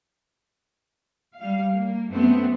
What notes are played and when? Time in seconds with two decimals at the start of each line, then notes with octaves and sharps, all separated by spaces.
1.39 G3 F5
1.74 A#3
2.10 F#2 A3 B3 C4 F#4